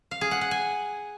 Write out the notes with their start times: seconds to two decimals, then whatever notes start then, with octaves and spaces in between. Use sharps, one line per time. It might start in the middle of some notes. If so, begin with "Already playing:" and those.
0.11 F5
0.21 G#4
0.31 F#5
0.41 F#5
0.51 G#5